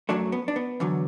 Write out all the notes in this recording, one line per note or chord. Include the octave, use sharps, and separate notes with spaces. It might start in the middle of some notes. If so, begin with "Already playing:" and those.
F#2 F#3 A3 D4
B3
D4
B3
E2 D3 F#3